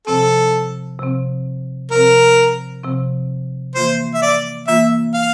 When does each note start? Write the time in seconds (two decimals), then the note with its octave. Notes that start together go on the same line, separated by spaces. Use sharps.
0.07 C3 F3 C4 A4
0.99 C3 F3 C4
1.91 C3 F3 C4 A#4
2.84 C3 F3 C4
3.75 E3 A#3 F4 C5
4.14 E5
4.22 D5
4.68 E3 A#3 F4 E5
5.14 F5